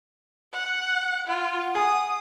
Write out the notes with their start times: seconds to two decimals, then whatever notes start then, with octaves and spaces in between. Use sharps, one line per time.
0.53 F#5
1.27 F4 F#5
1.75 G#4 D#6